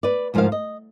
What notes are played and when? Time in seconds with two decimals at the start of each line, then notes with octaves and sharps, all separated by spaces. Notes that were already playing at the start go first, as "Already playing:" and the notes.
0.03 B4 D5
0.34 D2 G#2 F3 D4 A#4 F5
0.52 D#5